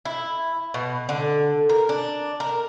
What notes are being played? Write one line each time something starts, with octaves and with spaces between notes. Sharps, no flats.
E4
B2
D3
A#4
D4
A#4